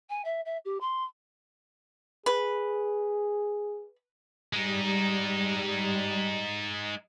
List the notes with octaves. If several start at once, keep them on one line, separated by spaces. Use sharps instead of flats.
G#5
E5
E5
G4
C6
G#4 B4
G3 G#3 D#4